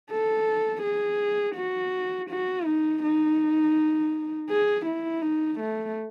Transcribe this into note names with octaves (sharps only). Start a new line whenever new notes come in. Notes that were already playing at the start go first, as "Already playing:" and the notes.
A4
G#4
F#4
F#4
D#4
D#4
G#4
E4
D#4
A3